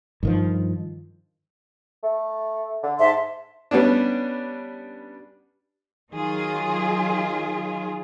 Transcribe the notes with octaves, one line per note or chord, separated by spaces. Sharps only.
G2 D#3 F3
A3
D3
G#2 E5 A5 C6
G3 B3 C#4 D4
D#3 F#3 F4 G#4